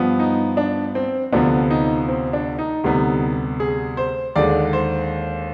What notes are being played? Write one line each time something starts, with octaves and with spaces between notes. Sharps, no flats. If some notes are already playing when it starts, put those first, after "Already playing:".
Already playing: G2 F3 B3
D#4
D4
C4
D2 C3 F3 B3 D4
D#4
C4
D4
D#4
D2 C3 G3 B3
G#4
C5
D#2 D3 G#3 D5
C5